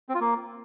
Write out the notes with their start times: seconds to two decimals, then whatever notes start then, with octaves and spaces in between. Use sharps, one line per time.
0.09 C4
0.15 F4
0.20 A#3